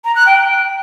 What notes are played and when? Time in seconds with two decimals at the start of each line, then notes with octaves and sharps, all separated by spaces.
0.05 A#5
0.16 F#6
0.26 G5